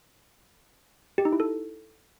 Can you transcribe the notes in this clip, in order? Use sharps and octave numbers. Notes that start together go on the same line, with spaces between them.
G4
D#4
E4
A4